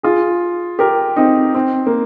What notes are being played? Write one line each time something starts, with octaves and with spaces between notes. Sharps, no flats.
F4 G#4
G4 A#4
C4 D#4
C4
A#3